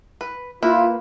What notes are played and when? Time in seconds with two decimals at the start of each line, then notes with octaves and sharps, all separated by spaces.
0.21 B4
0.63 A#3 E4 F4 B4